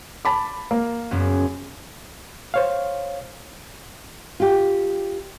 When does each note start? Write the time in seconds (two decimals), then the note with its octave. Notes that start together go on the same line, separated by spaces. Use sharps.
0.25 A5 B5 D6
0.71 A#3
1.11 F#1 F#2 B3
2.54 C5 C#5 F5
4.40 F4 G4